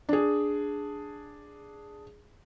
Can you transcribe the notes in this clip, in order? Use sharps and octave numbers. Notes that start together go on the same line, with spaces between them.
D4 G#4